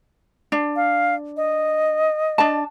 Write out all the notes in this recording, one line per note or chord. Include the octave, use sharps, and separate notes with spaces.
D4
F5
D#5
D4 A5